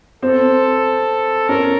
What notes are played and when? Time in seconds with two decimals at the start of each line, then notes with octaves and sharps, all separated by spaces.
0.22 C4 A4
1.49 C#4 A#4